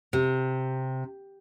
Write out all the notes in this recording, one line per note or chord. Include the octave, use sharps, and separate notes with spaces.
C3